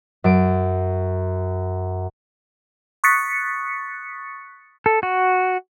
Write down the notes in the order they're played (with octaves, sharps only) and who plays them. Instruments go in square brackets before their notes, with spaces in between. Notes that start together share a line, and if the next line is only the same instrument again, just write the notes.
[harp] F#2 D7
[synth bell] C#6 D#6 F#6 A6 B6 C#7
[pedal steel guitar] A4
F#4